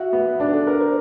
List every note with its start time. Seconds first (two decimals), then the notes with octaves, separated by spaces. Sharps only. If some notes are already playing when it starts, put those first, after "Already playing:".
Already playing: F#4 E5
0.13 B3
0.40 D4 D5
0.53 A4
0.67 A#4 B4
0.80 C5